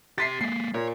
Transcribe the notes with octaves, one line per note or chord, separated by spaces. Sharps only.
G4 C6 A6 B6 C7
G#3 A#3 C7
A#2 C#5